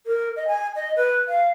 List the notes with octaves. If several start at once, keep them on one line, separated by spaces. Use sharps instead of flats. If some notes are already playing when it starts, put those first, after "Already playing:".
A#4
D#5
G#5
D#5
B4
F5